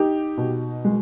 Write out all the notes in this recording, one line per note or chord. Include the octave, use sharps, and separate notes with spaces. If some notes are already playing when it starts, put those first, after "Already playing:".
Already playing: D#4 G4
B2
G#3